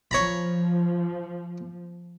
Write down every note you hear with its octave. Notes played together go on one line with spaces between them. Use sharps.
F3 C#5 A#5 B5